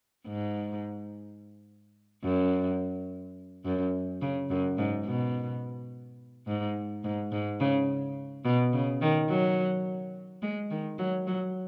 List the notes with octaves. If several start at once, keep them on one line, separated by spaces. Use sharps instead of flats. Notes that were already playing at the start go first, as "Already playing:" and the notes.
G#2
F#2
F#2
C#3
F#2
G#2
B2
G#2
G#2
G#2
C#3
B2
C#3
D#3
F#3
G#3
D#3
F#3
F#3